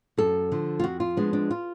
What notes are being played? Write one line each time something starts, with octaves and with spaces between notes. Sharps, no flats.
F#2 A4
D3 F3
F4
F2 F#4
F4
F3 G#3 B3 D4
D4
F4